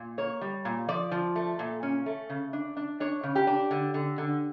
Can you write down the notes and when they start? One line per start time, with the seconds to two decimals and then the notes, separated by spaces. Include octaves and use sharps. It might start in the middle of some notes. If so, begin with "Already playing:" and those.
Already playing: A#2
0.18 A#3 C#5
0.41 G3
0.65 A#2
0.88 F3 D5
1.11 F3
1.36 A3
1.59 A#2
1.83 C#4
2.06 A3
2.30 C#3
2.53 D4
2.77 D4
3.00 D4 C#5
3.23 C#3
3.35 G4
3.47 D4
3.71 D3
3.94 D3
4.18 D3